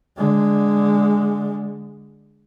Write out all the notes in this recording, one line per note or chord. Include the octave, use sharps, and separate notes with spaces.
D3 G#3